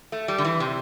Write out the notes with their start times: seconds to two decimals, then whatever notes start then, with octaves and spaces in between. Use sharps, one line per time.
0.12 A3
0.28 G3
0.38 D3
0.45 E3
0.60 C3